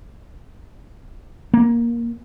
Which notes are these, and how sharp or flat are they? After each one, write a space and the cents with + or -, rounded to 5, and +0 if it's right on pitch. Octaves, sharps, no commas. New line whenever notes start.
A#3 +10